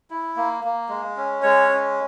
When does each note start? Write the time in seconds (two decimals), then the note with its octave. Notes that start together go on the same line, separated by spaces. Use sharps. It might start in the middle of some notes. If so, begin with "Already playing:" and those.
0.11 E4
0.36 A#3
0.64 A#3
0.89 G#3
1.17 C#4
1.42 G#3 C#5
1.68 C#4